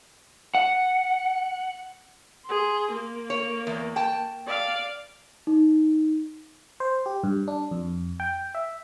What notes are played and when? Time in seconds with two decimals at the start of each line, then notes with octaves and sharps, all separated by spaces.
0.55 F#5
2.45 G#4 C6
2.91 A#3
3.30 C#5
3.67 E2
3.96 G5 A5
4.47 D5 F5
5.47 D#4
6.80 C5
7.06 G4
7.23 G2
7.48 D4
7.71 F2
8.20 G5
8.55 E5